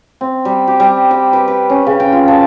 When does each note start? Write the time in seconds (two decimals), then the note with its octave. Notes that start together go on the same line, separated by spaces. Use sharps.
0.21 C4
0.45 G3
0.67 G4
0.80 G3
1.11 G5
1.33 B4
1.48 B4
1.70 C#4
1.87 C#3
2.00 G5
2.12 F4
2.28 A5